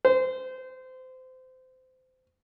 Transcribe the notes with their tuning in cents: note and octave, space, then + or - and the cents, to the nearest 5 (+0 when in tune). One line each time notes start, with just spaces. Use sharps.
C5 -25